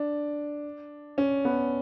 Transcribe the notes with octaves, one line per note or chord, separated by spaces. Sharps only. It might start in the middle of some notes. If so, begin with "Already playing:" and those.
Already playing: D4
C#4
B3